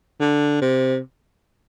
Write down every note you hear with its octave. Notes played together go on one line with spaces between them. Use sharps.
D3
C3